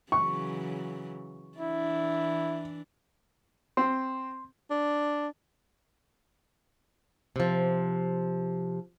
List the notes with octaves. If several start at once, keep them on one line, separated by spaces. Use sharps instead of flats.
C#3 E3 F#3 C#6
E3 D4 E4
C4 C6
D4
C3 F3